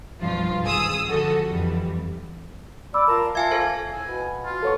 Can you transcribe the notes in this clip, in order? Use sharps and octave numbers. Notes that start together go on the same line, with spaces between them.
B1 G2 F3 F4
G#1 G#4 D#6 E6
D3 F3 F#4 A4
F2 E3 G3
D5 B5 D6 E6
F4 A#4 A5 A#5
F4 E5 F5 G#5 A5 G#6
A4 C5 G#6
A2 G#5 E6
B2 B3
F4
A#2 B3 A4 C#5 C#6